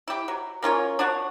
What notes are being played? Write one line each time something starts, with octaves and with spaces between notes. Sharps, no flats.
E4 G4
F#3
A#3 C#4 F4 C#5
D4 F#4 C#5 F#5